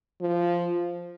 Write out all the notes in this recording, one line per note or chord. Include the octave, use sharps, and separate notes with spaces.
F3